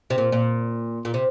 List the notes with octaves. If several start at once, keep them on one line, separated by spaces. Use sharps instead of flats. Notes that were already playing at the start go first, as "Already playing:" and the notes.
C3
A#2
A#2
A#2
C3